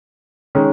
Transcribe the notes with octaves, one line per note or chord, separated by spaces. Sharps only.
D#3 G#3 C#4